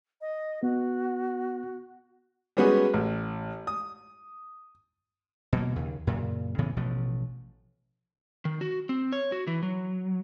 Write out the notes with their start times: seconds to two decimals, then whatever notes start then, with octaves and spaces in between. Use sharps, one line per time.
0.21 D#5
0.63 B3 F#4
2.57 G3 G#3 B3 C#4 F#4 G#4
2.94 A1
3.67 D#6
5.53 B2 F#3 A#3
5.72 D#2 C#3
6.07 F#2 A#2 C#3
6.58 A2 C#3 E3 B3
6.77 A1 B2 F3 A3
8.45 D#3
8.61 F#4
8.89 C4
9.12 C#5
9.32 F#4
9.47 E3
9.63 F#3